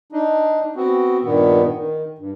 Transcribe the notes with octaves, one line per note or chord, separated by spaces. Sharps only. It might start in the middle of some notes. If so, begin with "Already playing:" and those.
D4 D#4
B3 C4 F#4
G2 A#2 D#3 B3
D#3
G2